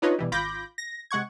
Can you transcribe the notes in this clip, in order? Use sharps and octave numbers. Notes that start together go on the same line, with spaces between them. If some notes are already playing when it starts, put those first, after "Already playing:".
D4 D#4 F4 B4 C#5 D#5
B2 E3 G3
G#1 F4 B5 D6 G6 A#6
A#6
C3 G#3 F#5 C#6 G#6